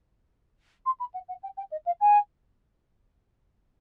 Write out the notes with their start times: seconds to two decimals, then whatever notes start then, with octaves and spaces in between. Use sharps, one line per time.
0.86 C6
1.00 B5
1.14 F#5
1.29 F#5
1.43 G5
1.57 G5
1.72 D#5
1.86 F5
2.01 G#5